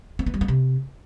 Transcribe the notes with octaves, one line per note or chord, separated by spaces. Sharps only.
C4
B3
G3
B3
C3